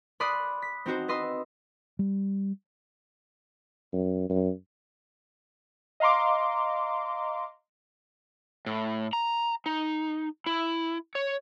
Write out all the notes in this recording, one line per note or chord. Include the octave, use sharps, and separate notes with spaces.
D5 B5 C6 D#6 F#6
B6
C4 D#4 F#4 C5
B4 D#5 C6 D#6 E6
G3
F#2
F#2
D#5 F5 A#5 C6 D6
A2
A#5
D#4
E4
C#5